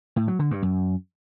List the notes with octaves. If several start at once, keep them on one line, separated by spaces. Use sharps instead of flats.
A2
F#3
D3
G2
F#2